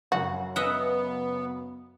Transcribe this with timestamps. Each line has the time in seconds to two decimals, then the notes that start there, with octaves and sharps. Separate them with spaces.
0.12 F#2 C#3 F#3 F#4
0.56 B3 D#5 E5 F#5